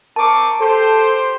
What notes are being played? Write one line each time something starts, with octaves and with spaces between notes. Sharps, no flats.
C4 A#4 A5 C#6 D6
G4 A4 C5